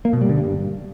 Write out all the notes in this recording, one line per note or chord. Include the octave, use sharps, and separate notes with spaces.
A#3
B2
G3
D3
G2